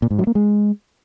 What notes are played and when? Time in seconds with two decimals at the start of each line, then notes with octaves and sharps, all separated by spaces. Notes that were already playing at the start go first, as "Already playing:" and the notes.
0.02 A#2
0.11 G#2
0.19 F#3
0.27 A#3
0.35 G#3